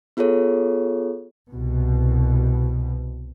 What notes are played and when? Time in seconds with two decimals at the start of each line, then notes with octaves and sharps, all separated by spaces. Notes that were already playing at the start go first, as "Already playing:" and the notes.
0.17 B3 F4 G#4 A4 C#5
1.51 C2 B2